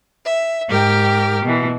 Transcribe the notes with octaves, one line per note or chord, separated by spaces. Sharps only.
E5
G#2 G4 A#4 G5 F6
B2 E3